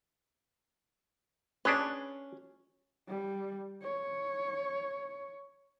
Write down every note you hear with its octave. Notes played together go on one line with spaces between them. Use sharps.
C#4 D4 G#4 B4
G3
C#5